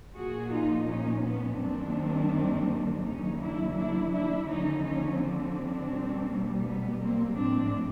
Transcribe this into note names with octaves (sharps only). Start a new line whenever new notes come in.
A#2 F3 A#3 F#4 G#4
D#4 F4
C#4 D#4
B3 C#4
F#2 D#3 G3 A#3 C4 D4
D#2 C#3 F#3 A#3 C#4 D#4
D4 E4
D4 E4
D4 E4
D#2 D3 F3 C#4 D#4
C#4 D#4
C4 D4
B2 G3 A#3
B3
A#3 C4
A2 F3 G#3 C4 D4